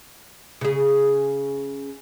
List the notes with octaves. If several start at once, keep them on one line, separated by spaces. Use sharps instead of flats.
C#3 G#4